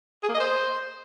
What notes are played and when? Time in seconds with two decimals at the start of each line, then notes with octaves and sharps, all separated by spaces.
0.23 G#4
0.29 A#3
0.34 D#5
0.40 C5